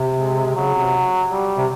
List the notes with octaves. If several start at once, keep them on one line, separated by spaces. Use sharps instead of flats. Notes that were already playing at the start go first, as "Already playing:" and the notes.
Already playing: C3
G#3
C#3 F#3
C3
G3
C3